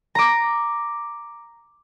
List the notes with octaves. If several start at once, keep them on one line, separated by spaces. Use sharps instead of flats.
A#5 D6